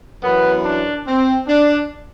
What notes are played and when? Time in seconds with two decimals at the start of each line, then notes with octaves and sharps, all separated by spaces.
0.23 F#2 E3 B3
0.64 D4
1.06 C4
1.48 D4